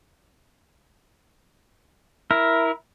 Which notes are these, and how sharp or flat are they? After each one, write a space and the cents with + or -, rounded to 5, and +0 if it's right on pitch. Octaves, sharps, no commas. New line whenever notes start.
E4 +0 A#4 +5